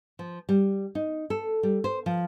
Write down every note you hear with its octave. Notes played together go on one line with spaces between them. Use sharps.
F3
G3
D#4
A4
G3
C5
F3